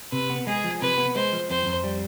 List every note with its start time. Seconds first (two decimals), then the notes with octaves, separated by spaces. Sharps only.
0.12 C3 B4
0.30 B3
0.47 G#3 G#4
0.64 F3
0.82 C3 B4
0.98 B3
1.15 G#3 C5
1.33 F3
1.50 F2 C5
1.66 F2
1.84 G3